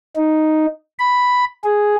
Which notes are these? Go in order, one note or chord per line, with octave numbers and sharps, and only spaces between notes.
D#4
B5
G#4